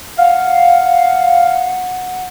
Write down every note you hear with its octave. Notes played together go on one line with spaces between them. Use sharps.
F5 F#5